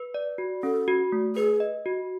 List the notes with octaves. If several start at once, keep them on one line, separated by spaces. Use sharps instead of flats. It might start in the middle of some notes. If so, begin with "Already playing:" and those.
Already playing: B4
D5
F#4
C#4 A4
F#4
A3
G#4 B4
D#5
F#4